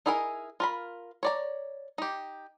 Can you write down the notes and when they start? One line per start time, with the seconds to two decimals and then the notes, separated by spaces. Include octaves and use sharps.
0.06 D#4 E4 G#4 A#4 G#5
0.60 F4 A#4 B5
1.23 C#5 D5 A#5
1.98 D#4 G4